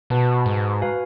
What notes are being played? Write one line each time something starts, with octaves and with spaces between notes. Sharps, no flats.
B2 F#4 B4 F#5 A5
G#2
F#4 B4 F5 G#5